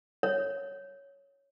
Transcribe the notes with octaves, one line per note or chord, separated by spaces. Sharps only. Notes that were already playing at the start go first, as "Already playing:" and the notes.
C#5